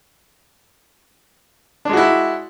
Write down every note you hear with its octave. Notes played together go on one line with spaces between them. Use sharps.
G#3 D4 E4 F#4